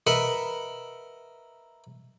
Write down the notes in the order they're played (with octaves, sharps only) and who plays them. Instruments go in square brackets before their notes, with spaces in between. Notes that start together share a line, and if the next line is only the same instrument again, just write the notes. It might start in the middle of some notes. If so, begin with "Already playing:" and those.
[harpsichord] A#4 B4 D#5 E5 F#5